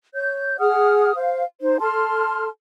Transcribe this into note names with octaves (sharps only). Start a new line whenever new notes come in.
C#5 G6
G#4 F#5 D#6 F6
C5 F5
D#4 C5
A4 A5 C6 F6